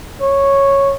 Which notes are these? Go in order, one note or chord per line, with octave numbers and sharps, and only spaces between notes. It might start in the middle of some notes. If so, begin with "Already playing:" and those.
C#5